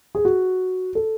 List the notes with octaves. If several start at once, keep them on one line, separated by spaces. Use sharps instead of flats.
G#4
F#4
A4